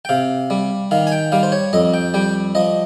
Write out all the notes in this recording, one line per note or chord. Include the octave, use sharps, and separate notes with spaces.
G5
C3 F5
G3
D#3 F5
G#5
G5
G3 F5
C5
C#5
F2 D#5
G5
G3 G5
F3 D#5